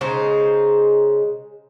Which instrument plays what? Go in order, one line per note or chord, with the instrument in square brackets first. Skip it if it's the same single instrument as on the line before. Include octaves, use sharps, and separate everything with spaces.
[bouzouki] C#3 G#3 D#4 C5